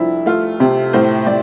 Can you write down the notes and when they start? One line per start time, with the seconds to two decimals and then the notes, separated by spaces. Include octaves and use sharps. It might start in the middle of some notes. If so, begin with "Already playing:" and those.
Already playing: C2 F3 A3 D4 E4
0.26 A3 F4
0.60 C3
0.93 A2 C5
1.27 A2 D5